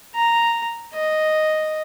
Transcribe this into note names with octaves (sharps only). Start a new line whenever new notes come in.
A#5
D#5